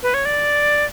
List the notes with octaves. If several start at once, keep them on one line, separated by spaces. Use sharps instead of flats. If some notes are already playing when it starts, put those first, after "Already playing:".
B4
C#5
D5